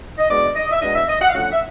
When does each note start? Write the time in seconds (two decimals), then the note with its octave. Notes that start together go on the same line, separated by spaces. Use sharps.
0.18 D#5
0.28 B2 G#3 B3 D4 D5
0.56 D#5
0.71 E5
0.81 B2 G#3 B3 D4 D#5
0.95 E5
1.08 D#5
1.21 F#5
1.29 F5
1.35 D3 F3 A3 C#4 F#5
1.52 E5